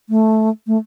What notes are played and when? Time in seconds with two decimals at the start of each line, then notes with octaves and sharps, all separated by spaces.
0.09 A3
0.67 A3